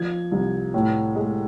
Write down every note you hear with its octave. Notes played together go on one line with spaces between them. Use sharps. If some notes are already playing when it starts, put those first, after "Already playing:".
Already playing: F3 G#6
C2
A2
G#3